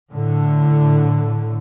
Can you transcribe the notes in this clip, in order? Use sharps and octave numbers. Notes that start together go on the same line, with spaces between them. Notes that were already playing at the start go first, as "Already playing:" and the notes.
A2 D3